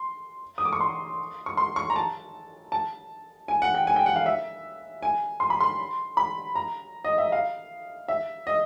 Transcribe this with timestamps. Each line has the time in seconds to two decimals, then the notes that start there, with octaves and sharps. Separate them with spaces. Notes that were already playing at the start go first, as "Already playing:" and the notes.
Already playing: C6
0.58 D#6
0.65 D6
0.73 C#6
0.81 C6
1.46 C#6
1.57 C6
1.76 C#6
1.90 A#5
1.96 A5
2.72 A5
3.48 G#5
3.62 F#5
3.75 G5
3.87 G#5
3.96 G5
4.06 F#5
4.16 F5
4.26 E5
5.03 G#5
5.40 C6
5.50 B5
5.60 C6
6.17 B5
6.55 A#5
7.04 D#5
7.18 E5
7.32 F5
8.08 E5
8.47 D#5